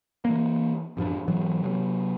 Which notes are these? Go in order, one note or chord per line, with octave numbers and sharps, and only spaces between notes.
E3 A#3
A1 F#2 F3 D4
G#2 E3 F#3
C3 F#3